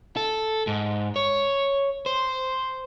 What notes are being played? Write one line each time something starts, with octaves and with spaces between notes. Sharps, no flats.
A4
G#2
C#5
C5